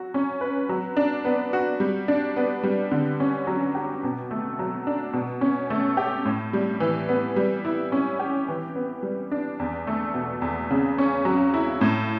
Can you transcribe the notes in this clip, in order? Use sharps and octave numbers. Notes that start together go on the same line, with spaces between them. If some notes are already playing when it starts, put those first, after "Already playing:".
Already playing: F#3 F#4
C#4
B4
F#3
D4
B3
F#4
G3
D4
B3
G3
D3
C#4
F#3
G4
B2
A3
F#3
D4
B2
C#4
A3
G4
A2
G3
E3
B3
G3
E4
C#4
G4
E3
B3
G3
D4
E2
A3
B2
E2
C#3
C#4
F#3
E4
A2